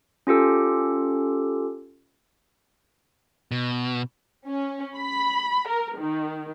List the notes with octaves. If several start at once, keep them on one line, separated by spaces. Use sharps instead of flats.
C#4 F4 G4 A4
B2
C#4
B5
A#4
D#3